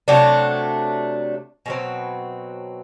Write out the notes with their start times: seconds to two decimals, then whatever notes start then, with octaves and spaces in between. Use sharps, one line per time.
0.08 C3 F#3 A3 D4
1.66 B2 F#3 C4